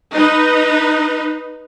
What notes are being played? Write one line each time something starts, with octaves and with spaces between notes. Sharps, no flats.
D#4 B4